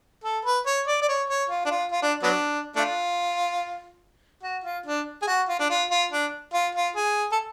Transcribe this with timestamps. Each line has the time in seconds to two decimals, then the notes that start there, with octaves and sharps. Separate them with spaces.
0.24 A4
0.45 B4
0.66 C#5
0.87 D5
1.02 D5
1.08 C#5
1.29 C#5
1.49 F4
1.65 D4
1.71 F4
1.91 F4
2.02 D4
2.23 F#3 B3 D4
2.76 A3 D4 F4
4.43 F#4
4.64 F4
4.86 D4
5.22 G#4
5.27 F#4
5.49 F4
5.60 D4
5.70 F4
5.91 F4
6.11 D4
6.53 F4
6.75 F4
6.95 G#4
7.32 A4